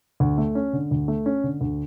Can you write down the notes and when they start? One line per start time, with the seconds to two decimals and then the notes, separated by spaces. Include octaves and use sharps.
0.20 D2
0.38 A3
0.55 C#4
0.73 D3
0.91 D2
1.08 A3
1.26 C#4
1.44 D3
1.61 D2